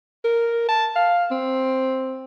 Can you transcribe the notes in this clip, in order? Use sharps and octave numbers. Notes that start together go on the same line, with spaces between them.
A#4
A5
F5
C4